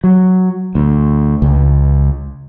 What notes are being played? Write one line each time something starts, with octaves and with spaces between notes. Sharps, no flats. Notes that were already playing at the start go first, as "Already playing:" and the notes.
F#3
D2
C#2